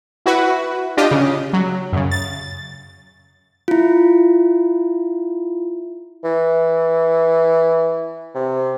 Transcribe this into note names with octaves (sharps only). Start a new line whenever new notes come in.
E4 F#4 B4
D4 F4 G4 D#5
C#3
F#3
F#2 C#3
A6
E4 F4
E3
C3